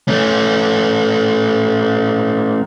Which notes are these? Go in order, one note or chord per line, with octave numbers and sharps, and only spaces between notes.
A3 C#4